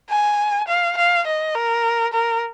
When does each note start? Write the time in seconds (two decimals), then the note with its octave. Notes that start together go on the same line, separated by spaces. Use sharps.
0.10 G#5
0.68 F5
0.97 F5
1.27 D#5
1.55 A#4
2.13 A#4